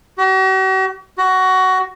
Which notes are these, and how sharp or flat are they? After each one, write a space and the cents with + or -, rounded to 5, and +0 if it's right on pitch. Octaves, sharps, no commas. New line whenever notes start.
F#4 +45
F#4 +15